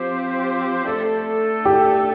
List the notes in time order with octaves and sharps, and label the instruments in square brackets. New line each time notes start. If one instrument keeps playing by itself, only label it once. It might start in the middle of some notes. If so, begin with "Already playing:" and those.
Already playing: [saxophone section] F3 C4 G4 C5
A3 D4 A4
[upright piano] G4